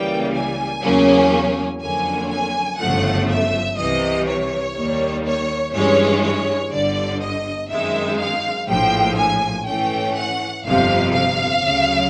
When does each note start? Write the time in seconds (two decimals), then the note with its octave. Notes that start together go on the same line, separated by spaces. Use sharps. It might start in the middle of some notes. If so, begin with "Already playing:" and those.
Already playing: C#2 C#3 E3 G3 A#3 G5
0.34 G#5
0.83 E2 C#3 F#3 A#3 C#4
1.81 F2 D3 F#3 A#3 C#4 G#5
2.30 G#5
2.79 G1 F#2 C#3 F3 A3 F#5
3.29 E5
3.77 C2 C3 E3 D#5
4.27 C#5
4.75 D#2 D#3 G3 A#3
5.25 C#5
5.73 G2 E3 G#3 C#4 C#5
6.22 C#5
6.71 G1 G2 D3 D5
7.21 D#5
7.69 F#2 D#3 G#3 C4 E5
8.19 F5
8.68 A#1 A2 F3 G5
9.16 G#5
9.66 G#2 E3 A3 C#4 G5
10.15 F#5
10.64 G1 F2 C3 F5
11.13 F5
11.62 D2 C#3 F#3